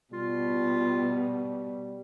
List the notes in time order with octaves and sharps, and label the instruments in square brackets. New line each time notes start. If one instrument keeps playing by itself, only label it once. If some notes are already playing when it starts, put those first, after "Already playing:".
[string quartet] B2 [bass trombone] G3 [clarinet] F4